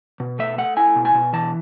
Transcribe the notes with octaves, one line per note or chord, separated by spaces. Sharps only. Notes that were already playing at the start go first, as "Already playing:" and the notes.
B2
A3 E5
A3 F#5
E4 G#5
B2
G#5
B2
E3 A5